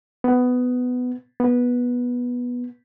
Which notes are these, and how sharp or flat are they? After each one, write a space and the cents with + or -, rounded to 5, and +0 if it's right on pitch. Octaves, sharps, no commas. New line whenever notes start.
B3 +15
B3 -10